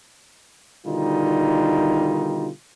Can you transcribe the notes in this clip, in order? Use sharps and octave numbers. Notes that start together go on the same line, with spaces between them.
B2 D3 D#3 G3 D#4 F4